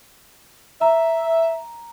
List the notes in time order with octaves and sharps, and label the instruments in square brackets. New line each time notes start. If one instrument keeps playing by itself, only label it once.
[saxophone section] E5 [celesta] A#5